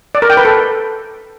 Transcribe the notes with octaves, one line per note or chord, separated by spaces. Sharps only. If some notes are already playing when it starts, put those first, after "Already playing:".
D5
A#4
G5
B4
A4